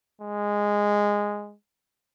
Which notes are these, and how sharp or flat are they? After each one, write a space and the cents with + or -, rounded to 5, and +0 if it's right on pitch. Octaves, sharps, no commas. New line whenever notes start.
G#3 -10